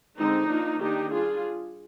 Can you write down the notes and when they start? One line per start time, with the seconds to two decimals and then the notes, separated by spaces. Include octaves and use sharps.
0.19 D3 G#3 C4 D#4
0.50 F3 A#3 D4
0.80 D#3 A#3 D4 D#4 G4
1.11 G3 D4 F4 G#4